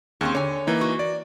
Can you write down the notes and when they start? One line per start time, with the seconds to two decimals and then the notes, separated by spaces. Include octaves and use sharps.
0.21 D#2 C4 C#4 G#4
0.35 D3 C#5 G#5
0.67 E3 A#3 D#4
0.81 F#4
0.99 D5